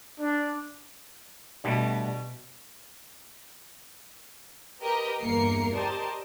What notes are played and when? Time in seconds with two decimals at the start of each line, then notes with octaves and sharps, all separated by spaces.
0.20 D4
1.64 B2 D3 G3 A3
4.81 G4 A#4 B4 D#5 G5
5.22 G1 E2 A#3 A#4 C7 C#7
5.73 G4 A#4 C5 D5 D#5 A5